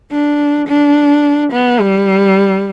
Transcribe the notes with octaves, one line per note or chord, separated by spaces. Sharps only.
D4
D4
B3
G3